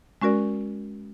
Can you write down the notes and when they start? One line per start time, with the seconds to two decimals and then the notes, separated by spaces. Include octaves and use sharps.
0.22 G#3 C#4 F#4 A#4 D5